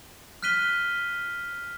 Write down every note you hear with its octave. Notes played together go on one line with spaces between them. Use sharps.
F6 F#6 B6 D#7 G7